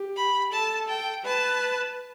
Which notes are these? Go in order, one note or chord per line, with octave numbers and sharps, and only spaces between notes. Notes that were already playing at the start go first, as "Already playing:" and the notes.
Already playing: G4
B5
A4 A5
G5
B4 A5